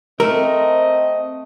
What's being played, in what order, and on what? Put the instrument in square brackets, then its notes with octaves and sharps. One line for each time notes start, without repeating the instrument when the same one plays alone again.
[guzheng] A3 [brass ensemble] C4 [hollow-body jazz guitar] A#4 [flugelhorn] D#5